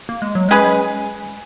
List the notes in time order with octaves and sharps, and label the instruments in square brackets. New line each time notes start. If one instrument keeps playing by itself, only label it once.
[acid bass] A#3
G#3
F#3
[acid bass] G#3 [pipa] C#4 G#4 B4